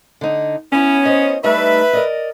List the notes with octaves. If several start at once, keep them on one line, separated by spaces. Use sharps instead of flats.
D3 D#4
B3 C#4 E4 G#5
C5 C#5 D#5
G3 A3 D#4 B4 E5
A#4 D5 D#5